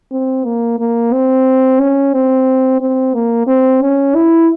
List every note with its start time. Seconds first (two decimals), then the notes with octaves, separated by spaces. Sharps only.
0.12 C4
0.45 A#3
0.79 A#3
1.13 C4
1.80 C#4
2.14 C4
2.80 C4
3.14 A#3
3.47 C4
3.82 C#4
4.15 E4